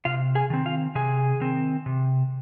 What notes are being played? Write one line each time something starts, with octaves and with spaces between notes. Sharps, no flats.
C3 F4 F5
G#4 G#5
D#3 C4
F4 F5
C3 G#4 G#5
D#3 C4
C3